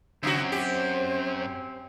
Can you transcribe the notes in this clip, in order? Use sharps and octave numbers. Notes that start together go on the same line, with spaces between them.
F#2 C#3 C4 C#4 F#4
G4 C5